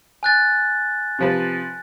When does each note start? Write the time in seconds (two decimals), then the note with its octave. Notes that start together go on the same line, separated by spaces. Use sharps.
0.23 G#5 F#6 A6
1.19 C3 F3 B4